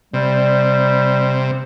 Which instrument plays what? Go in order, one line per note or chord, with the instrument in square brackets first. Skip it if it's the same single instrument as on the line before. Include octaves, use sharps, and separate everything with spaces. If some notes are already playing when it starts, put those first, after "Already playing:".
[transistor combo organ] C3 [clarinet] G3